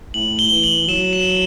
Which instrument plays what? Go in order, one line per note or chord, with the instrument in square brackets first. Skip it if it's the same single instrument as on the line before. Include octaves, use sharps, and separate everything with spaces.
[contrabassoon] A2 [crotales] F#7
[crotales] G7
[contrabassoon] E3
[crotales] F#7
[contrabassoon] F#3 [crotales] E7
[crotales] E7